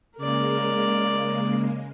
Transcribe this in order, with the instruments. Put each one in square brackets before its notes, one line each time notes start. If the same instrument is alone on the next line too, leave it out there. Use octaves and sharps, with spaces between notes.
[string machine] C#3 G#3 A#3 [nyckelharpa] A#4 D5